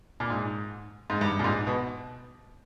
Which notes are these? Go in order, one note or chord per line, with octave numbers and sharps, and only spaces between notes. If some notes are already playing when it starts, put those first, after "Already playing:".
A#2
G#2
G#2
G2
A#2
G#2
B2